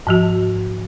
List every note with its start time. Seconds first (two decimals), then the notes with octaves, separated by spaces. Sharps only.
0.07 G#2 F3 F#4